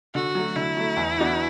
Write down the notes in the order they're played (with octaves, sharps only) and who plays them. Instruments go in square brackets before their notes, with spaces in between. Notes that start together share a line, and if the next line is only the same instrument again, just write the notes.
[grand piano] D3 [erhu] F#4
[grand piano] F#3 A3
[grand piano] D3 [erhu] E4
[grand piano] F#3 A3
E2
E3 B3 D4 F#4